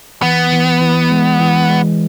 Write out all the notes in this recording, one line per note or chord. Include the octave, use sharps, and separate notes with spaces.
E3 B3
E3
E3
G#3
E3
G#3